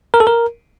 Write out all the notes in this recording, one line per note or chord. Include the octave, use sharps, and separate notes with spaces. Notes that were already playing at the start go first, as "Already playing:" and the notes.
A#4
A4
A#4